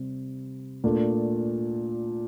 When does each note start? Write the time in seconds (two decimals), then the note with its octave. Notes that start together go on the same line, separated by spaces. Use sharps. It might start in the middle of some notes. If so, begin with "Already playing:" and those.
Already playing: C3 G3 C4
0.84 A#2 A3 D4 A4